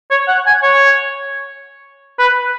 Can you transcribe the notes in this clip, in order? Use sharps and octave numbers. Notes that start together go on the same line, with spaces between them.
C#5
F#5
G#5
C#5
B4